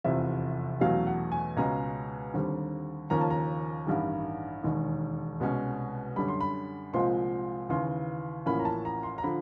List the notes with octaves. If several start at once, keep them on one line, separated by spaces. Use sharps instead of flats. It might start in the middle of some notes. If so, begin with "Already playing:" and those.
F1 E2 C3 F3 E5
E2 B2 F#3 A3 C#4 F5
F#5
G#5
C#2 B2 G#3 C#4 A#5
D#2 D3 G3 C4
D#2 C#3 F3 A#3 C#4 A#5
A5
A#5
A1 G2 D#3 G3
E1 D#2 D#3 G#3
C2 B2 G#3 C#4
F#2 D3 G3 B5
C6
B5
C2 A#2 F3 G#3 C4 C6
D#2 C#3 E3 C6
A1 A2 F3 A#3 C#4 B5
A#5
A5
A#5
C6
A#5
D3 F3 B5